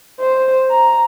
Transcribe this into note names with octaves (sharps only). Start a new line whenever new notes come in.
C5
A#5